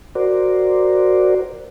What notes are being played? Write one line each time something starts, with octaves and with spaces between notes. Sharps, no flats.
F#4 A#4 C5 D5